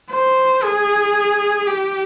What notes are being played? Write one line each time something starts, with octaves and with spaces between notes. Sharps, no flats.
C5
G#4
G4